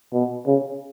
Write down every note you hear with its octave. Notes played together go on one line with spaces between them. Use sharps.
B2
C#3